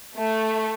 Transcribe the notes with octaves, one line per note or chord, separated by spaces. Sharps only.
A3